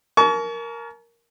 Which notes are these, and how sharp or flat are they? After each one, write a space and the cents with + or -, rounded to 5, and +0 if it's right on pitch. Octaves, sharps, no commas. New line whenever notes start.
A#4 +0 A5 -45 C#6 +35